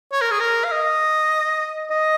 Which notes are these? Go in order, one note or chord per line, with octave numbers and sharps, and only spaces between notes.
C#5
A#4
G#4
A#4
F5
D#5
D#5